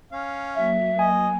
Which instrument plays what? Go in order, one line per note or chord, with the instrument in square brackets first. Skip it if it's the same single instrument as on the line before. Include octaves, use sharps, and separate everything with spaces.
[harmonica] C#4 F5
[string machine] F#3 A#3 [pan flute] E5
[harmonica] D#5 [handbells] G#5